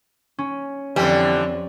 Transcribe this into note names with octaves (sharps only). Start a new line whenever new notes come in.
C#4
F2 D3 E3 G3